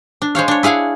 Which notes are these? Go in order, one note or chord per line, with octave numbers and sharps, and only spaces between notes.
D4
G#3 C5 C#5 F5
D4 C#5
E4 G#4 F5 F#5 G#5